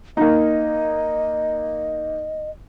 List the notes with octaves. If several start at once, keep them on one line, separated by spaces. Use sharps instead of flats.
A#3 D#4 D#5